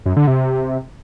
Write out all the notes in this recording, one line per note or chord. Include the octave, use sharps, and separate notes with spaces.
F#2
D3
C3